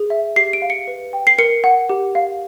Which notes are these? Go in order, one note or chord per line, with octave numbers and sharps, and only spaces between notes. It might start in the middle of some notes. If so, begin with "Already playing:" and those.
Already playing: G#4
E5
G4 C7
D7
F5
C#7
B4
G5
C7
A#4 C#7
F#5
G4
F5